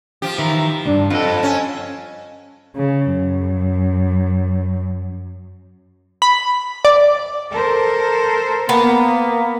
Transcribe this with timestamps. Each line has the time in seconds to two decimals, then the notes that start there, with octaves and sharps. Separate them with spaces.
0.22 F3 G4
0.38 D#3 E3 E4 A#5
0.86 C#2 G2 D4
1.10 F2 F4 A4 F#5
1.43 C#4 G#5
2.76 C#3
3.14 F#2
6.22 B5
6.85 D5
7.52 A4 A#4 C5
8.69 A#3 B3